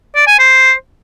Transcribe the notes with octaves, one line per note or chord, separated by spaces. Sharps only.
D5
G#5
C5